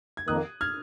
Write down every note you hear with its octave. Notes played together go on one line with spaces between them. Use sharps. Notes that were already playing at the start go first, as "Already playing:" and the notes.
G#6
F2 D#3 A#3 D#6 F#6
F6 G#6